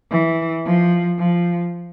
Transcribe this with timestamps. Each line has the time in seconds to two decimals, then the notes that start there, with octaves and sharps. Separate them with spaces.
0.11 E3
0.65 F3
1.19 F3